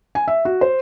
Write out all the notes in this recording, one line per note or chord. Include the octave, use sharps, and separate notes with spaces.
G#5
E5
F#4
C5